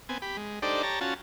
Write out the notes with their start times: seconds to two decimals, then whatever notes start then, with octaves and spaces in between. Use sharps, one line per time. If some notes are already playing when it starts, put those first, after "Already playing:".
0.09 B3 C4 G#5
0.22 G4 B5
0.37 G#3
0.62 D4 D#4 G4 A4 C5 D5
0.83 G4 C#5 A5 A#5
1.01 C#4 F4 F#4 A5